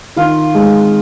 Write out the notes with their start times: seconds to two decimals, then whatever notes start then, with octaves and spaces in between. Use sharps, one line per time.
0.16 D#3 F4
0.55 G#3